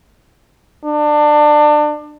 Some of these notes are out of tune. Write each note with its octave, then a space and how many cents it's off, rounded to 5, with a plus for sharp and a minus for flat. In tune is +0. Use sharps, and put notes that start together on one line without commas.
D4 +25